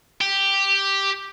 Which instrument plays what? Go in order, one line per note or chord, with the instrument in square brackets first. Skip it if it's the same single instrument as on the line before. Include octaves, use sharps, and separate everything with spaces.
[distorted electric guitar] G4